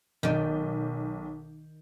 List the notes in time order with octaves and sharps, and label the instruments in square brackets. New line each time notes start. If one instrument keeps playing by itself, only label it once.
[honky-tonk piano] B1 G6 [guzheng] D#3 D5